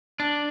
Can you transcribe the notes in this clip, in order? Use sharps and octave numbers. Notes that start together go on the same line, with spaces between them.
D4